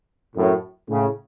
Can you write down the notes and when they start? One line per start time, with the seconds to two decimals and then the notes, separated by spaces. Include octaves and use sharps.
0.36 F#2 A2
0.89 A2 C#3